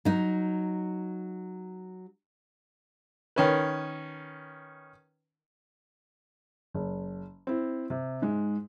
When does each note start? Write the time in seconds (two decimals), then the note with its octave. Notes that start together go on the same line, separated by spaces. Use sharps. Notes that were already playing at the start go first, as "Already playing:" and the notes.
0.05 F#3 D#4
3.36 D#3 C#4 B4
6.74 F#1
7.47 C4 E4
7.90 C3
8.22 G#2 G#3